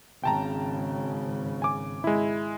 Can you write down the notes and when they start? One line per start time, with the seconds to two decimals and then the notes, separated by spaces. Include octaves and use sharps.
0.23 G#1 C#3 G5 A5 A#5
1.62 G#5 D6
2.04 G#3 E4